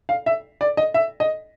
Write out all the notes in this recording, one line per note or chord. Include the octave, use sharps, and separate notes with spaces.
F5
E5
D5
D#5
E5
D#5